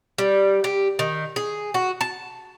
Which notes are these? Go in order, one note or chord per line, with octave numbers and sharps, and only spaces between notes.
G3
G4
D#3
G#4
F#4
A5